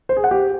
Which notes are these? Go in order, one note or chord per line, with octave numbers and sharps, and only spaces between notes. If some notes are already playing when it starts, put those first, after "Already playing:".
C5
G#4
F#5
G4